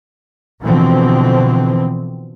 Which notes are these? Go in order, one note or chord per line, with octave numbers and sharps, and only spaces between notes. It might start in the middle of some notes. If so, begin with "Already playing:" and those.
B2 D3 E3 F3 C4